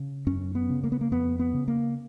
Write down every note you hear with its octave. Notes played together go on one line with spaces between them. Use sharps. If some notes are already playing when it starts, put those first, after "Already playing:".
Already playing: C#3
F#2 C#4
B3
C#3
A#3
B3
A#3
F2 B3
B3
C#3
A#3